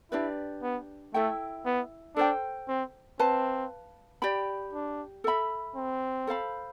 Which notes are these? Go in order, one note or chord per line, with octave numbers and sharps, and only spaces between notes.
D4 E4 G4 B4 D5
B3
A3 E4 A4 E5 G5
B3
D4 A4 C5 G5
C4
C4 B4 F5 A5
G4 D5 G5 B5
D4
A4 E5 B5
C4
A4 C5 F5 B5